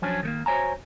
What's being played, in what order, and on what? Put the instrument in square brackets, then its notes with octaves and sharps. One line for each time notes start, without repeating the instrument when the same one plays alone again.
[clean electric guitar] F3 F#3 C#4 D4 C#5
D#3 A3 A#3
F#4 C5 C#5 G#5 A#5